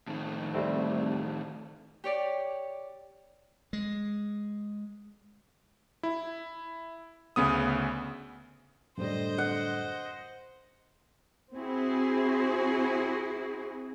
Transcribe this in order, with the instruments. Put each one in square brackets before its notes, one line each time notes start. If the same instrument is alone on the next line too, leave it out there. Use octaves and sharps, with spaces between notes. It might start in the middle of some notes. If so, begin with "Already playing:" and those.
[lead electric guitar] A2 D#3
[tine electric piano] G3 A3 C4
[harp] G4 C#5 D5
[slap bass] G#3
[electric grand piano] E4
D2 C#3 B3 D#6
[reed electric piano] F#2 A2 G3 [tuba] D3 [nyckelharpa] C5 D#5
[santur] F#5
[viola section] C4 [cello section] E4 F#4 G#4